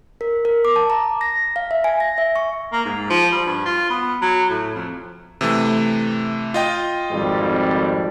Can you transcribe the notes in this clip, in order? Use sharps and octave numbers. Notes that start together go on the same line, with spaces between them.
A#4
A#4
D6
A5
A#5
A#6
F5
E5
G#5
A#6
E5
C#6
A#3
G#2
F3
G3
G2
F4
B3
F#3
A2
F2
C3 E3 A3
F4 D#5 G5
G#1 F2 G3